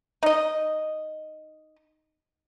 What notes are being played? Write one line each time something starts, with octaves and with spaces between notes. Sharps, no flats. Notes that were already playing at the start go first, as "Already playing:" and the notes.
D#4 D#5